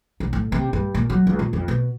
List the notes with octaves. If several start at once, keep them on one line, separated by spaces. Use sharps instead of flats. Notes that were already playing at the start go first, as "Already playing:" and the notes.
B1
A2
C3
G2
A#2
F#3
C#2
A#2
F2
B2